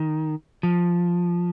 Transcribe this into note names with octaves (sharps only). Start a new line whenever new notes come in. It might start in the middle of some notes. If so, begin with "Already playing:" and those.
Already playing: D#3
F3